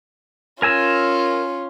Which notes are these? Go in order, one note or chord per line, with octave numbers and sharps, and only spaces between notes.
C#4 F4 A#4 G#5 E6